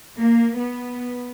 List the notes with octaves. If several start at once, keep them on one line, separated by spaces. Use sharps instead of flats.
A#3
B3